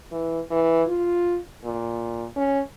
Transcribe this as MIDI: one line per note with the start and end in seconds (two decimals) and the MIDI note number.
0.11 0.40 52
0.51 0.83 52
0.88 1.39 65
1.65 2.25 46
2.36 2.60 61